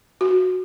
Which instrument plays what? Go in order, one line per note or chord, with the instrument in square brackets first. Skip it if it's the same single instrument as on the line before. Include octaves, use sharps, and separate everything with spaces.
[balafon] F#4